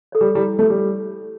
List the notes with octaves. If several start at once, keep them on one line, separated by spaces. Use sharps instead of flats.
A4 C#5
G3
G3 E4
A3 A4 C#5
G3